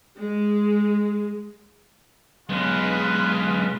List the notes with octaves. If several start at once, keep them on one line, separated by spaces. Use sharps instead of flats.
G#3
B1 G#3 F4 B4